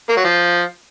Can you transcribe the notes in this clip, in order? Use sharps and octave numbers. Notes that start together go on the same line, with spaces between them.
A#3
F#3
F3